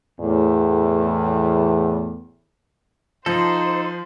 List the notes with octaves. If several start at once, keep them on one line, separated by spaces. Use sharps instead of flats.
E2 A2
F3 D#4 A4 C5 C6